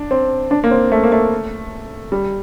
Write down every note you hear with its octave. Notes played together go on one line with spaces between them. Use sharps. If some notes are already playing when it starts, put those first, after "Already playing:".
Already playing: D4
C4
D4
A#3
C4
A3
A#3
A3
G3